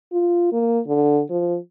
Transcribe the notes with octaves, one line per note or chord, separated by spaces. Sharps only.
F4
A#3
D3
F3